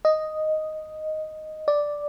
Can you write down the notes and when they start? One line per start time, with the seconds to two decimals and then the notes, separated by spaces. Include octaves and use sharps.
0.05 D#5
1.68 D5